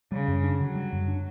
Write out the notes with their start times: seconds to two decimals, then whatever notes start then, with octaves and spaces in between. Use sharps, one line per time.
0.12 C#3 G3
0.28 F#2
0.44 D4
0.60 D3 F#3
0.75 G3
0.93 F#2
1.08 D4